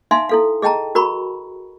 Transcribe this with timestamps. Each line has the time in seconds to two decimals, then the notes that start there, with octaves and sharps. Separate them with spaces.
0.11 D#4 E5 F5 G#5 C6
0.29 E4 A4 F5
0.62 G#4 D#5 G5 A5 A#5
0.95 F#4 A#4 A#5 B5 C#6